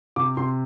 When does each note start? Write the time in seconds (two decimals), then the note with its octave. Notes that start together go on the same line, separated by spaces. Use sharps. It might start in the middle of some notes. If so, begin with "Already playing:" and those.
0.16 C3 D6
0.37 C3 C6